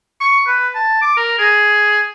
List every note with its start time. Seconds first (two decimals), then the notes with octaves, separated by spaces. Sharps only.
0.21 C#6
0.47 B4
0.75 A5
1.02 D6
1.17 A#4
1.39 G#4